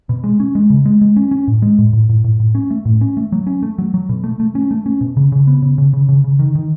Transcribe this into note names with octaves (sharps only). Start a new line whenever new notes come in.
B2
G#3
C#4
G#3
C#3
G#3
G#3
C#4
C#4
A2
G#3
A2
A2
A2
A2
A2
C#4
A3
A2
C#4
A3
F#3
C#4
A3
F#3
F#3
B2
A3
A3
C#4
A3
C#4
B2
C#3
C#3
B3
C#3
C#3
C#3
C#3
C#3
D#3
D#3